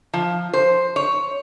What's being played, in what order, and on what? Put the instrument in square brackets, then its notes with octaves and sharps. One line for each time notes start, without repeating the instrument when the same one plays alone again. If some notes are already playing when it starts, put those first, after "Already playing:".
[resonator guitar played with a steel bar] F3
C5
C#5